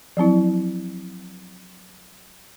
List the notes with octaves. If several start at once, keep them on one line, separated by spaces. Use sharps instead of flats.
F3 F#3 C4 E4